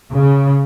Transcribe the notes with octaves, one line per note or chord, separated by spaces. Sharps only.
C#3